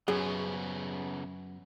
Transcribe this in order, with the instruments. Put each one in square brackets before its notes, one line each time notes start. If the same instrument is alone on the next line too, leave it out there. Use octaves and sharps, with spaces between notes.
[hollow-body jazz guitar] F#2 [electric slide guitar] C#3 B3 [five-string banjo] G#4